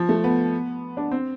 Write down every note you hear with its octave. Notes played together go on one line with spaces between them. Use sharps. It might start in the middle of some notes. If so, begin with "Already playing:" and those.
Already playing: F3
A3
B3
D4
C4